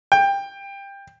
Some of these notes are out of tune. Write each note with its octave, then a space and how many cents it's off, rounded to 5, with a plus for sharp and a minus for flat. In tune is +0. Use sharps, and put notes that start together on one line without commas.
G5 +20